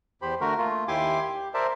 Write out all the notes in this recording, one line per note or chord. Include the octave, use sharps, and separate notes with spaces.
E2 G4 C5 B5
D3 A3 F#4 A#4
A3 A#3 F4
D#2 E4 G4 G#5 C6 D6
G4
A#4 C5 D5 E5 A5